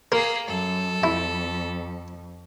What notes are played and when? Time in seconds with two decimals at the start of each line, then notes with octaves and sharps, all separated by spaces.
0.12 A#3 G#4 A#4
0.47 F#2 A4
1.04 F2 E4